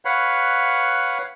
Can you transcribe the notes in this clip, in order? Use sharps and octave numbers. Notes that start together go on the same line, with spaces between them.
B4 C#5 F5 F#5 B5